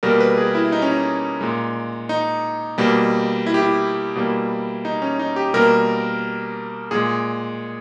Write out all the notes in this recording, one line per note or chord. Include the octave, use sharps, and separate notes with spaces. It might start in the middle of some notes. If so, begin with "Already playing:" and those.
B2 G3 A#3 A#4
B4
G#4
E4
D#4
C#4
D#4
A#2 G#3
D#4
B2 G3 A#3
E4
G4
E4
B2 G3 A#3
D#4
C#4
D#4
G4
B2 G3 A#3 A#4
A#2 G#3 G#4